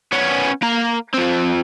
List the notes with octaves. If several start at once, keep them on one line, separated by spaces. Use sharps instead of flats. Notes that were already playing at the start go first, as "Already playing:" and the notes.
B3 C#4
A#3 A#5
F3 C4